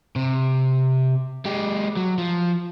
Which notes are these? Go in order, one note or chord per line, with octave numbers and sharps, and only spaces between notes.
C3
G#3 G4
F#3
F3